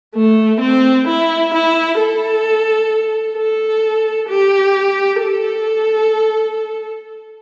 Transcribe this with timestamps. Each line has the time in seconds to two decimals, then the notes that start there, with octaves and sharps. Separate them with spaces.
0.15 A3
0.61 C4
1.07 E4
1.53 E4
1.99 A4
3.37 A4
4.29 G4
5.22 A4